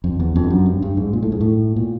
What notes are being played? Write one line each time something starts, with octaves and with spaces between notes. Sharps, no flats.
F2
E2
F2
G2
F#2
G2
G2
G#2
A#2
A2
G#2
A2
A#2